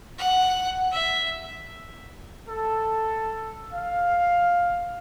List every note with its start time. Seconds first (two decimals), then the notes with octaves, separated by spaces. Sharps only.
0.18 F#5
0.92 E5
2.48 A4
3.72 F5